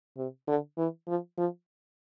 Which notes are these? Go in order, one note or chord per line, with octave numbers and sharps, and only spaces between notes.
C3
D3
E3
F3
F3